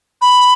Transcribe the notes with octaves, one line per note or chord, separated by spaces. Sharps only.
B5